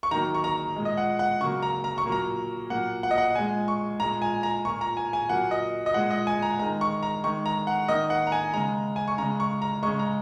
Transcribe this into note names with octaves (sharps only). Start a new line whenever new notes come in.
C#6
D#3 F#3 A#3 A#5
C#6
A#5
A#2 G#3
D#5
F#5
F#5
C#3 F#3 A#3 C#6
A#5
A#5
C#6
A#2 F#3 A#3
A#5
A#2 F#3 A#3 F#5
F#5
D#5
F#5
A#2 G#3 G#5
C#6
A#2 G#3 A#5
G#5
A#5
A#2 A#3 C#6
A#5
G#5
G#5
A#2 F#3 A#3 F#5
D#5
D#5
A#2 G#3 F#5
D#5
G#5
A#5
D#3 G#3 A#5
C#6
A#5
D#3 G#3 C#6
A#5
F#5
D#3 A#3 D#5
F#5
A#5
G#5
C#3 G#3 A#5
G#5
C#6
C#3 G#3 A#5
C#6
A#5
C#3 G#3 C#6
A#5